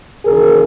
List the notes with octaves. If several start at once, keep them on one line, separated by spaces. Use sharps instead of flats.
D#2 C#3 E3 G#4 A#4